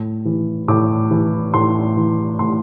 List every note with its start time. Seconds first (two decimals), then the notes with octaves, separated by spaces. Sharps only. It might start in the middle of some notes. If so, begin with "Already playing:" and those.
Already playing: A2
0.25 E3
0.68 A2 D6
1.11 E3
1.54 A2 C6
1.97 E3
2.39 A2 C6